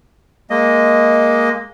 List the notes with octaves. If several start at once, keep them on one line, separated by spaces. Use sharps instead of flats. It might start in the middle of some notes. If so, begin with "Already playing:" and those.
G#3 A#3 D#5